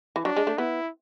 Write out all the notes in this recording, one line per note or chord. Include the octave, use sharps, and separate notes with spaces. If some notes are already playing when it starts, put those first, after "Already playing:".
E3
F#3 D4
G#3
A3
B3 E4